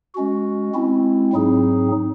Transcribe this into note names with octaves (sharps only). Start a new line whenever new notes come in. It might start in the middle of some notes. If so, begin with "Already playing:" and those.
G#3 C#4 F#4
G#3 C4 E4
G#2 F#3 C4 D#4 G#4